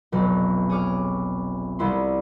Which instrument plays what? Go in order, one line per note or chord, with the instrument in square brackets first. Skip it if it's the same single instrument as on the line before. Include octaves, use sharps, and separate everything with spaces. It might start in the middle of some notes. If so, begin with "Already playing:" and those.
[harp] F1 B1
G#4 C#5 D6 F6
C2 E4 C6